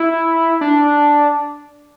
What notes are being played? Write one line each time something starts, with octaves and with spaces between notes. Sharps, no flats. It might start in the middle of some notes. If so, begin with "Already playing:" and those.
Already playing: E4
D4